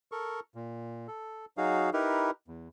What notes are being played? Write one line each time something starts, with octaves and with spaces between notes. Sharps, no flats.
A4 A#4 C#6
A#2
A4
F#3 D#4 F#4 G#4 F5
D#4 E4 G4 A#4 B4
E2